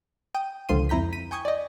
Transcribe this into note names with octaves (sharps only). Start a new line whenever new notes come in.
G5 D#6
C#2 D3 F3 F4 C6 D#7
F2 E4 A#5 G6 B6
B6 D#7
G5 G#5 C#6 D#6 G6 G#6
D5 D#5